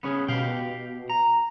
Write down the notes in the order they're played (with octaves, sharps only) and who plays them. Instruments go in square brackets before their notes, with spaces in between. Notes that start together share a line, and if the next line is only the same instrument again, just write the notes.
[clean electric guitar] B3 C#4 G#4
[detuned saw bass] B2 [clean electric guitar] G4 F5 G5
[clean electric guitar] A#5